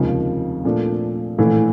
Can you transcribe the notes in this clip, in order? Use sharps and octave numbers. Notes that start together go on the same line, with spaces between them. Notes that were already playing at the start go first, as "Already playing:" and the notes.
Already playing: F1 D#2 C#3 F3 G#3
A#2 F3 A3 D4
A#1 A2 E3 A3